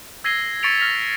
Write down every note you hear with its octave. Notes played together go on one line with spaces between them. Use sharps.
E6 G#6 A#6 C7 D#7 G7
C#6 A6 B6 C#7 D7 F7
F6 A#6 B6 F7